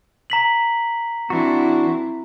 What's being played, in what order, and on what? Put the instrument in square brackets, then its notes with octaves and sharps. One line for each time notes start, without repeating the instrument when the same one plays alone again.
[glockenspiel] A#5 B6 F#7
[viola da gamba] E3 C4 E4 [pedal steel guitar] D4 F#4